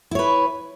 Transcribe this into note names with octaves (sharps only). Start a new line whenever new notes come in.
E4 B4 C#5